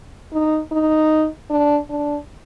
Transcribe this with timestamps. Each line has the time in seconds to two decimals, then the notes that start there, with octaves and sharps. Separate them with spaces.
0.33 D#4
0.72 D#4
1.50 D4
1.90 D4